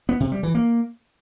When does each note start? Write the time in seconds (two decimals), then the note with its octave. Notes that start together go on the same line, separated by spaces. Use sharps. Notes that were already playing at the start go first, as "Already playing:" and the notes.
0.09 B3
0.20 C3
0.32 G3
0.43 E3
0.55 A#3